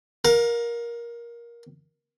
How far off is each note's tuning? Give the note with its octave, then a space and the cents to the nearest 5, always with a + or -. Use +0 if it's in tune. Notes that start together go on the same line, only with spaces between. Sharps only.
A#4 +15 F5 +40